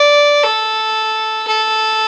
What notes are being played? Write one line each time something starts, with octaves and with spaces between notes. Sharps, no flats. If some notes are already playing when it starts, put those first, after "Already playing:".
Already playing: D5
A4
A4